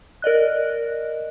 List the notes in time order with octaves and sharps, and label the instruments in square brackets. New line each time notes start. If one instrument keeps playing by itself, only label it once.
[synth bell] A#4 D5 D#5 F#6